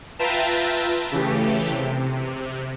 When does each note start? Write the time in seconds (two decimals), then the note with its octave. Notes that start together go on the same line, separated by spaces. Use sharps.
0.19 F4 B4 E5 G5 A5 A#5
1.12 C#3 E3 A3 G4
1.69 C3